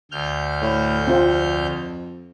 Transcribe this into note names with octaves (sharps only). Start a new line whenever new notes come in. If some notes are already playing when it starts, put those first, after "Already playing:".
D2 F6 G6
A2
F2 C4 F4